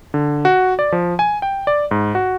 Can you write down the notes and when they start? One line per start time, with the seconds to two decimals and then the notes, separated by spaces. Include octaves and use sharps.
0.14 D3
0.45 F#4
0.79 D5
0.92 F3
1.19 G#5
1.42 G5
1.67 D5
1.91 G#2
2.15 F#4